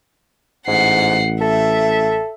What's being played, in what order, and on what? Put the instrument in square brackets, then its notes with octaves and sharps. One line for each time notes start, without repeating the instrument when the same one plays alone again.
[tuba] A1 [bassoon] G#2 [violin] F#5 C7
[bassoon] A4 [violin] E5